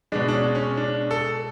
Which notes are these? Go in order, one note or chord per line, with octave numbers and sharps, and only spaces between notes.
B2 G#3 D4
D4
C#4
C#4
D4
A4